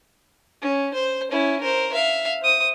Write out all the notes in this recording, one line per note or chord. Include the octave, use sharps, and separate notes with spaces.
C#4
C5
C#4 E4
A#4 C5
E5 F5
C5 D#6